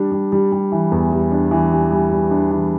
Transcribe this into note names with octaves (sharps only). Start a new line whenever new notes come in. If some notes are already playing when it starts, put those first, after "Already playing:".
Already playing: G3 D4
G3
G3
G3
E3
E2
G3
D4
E3
G3
G3
G3
D4
E3